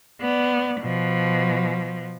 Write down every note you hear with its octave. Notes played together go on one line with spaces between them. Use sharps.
B3 D5
B2 F3